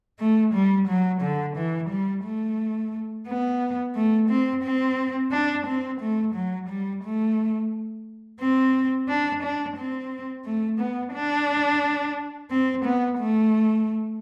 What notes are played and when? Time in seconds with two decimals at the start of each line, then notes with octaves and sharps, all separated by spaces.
0.19 A3
0.54 G3
0.87 F#3
1.21 D3
1.56 E3
1.90 G3
2.24 A3
3.27 B3
3.95 A3
4.29 C4
4.64 C4
5.31 D4
5.67 C4
6.00 A3
6.34 F#3
6.69 G3
7.04 A3
8.40 C4
9.08 D4
9.42 D4
9.76 C4
10.45 A3
10.79 B3
11.13 D4
12.50 C4
12.84 B3
13.18 A3